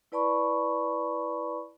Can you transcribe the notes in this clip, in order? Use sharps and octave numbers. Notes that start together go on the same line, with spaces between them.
E4 B4 D5 A5 B5 C#6